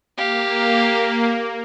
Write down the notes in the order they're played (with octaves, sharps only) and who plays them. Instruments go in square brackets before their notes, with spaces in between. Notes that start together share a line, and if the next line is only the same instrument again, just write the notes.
[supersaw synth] A#3 [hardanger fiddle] G4 F5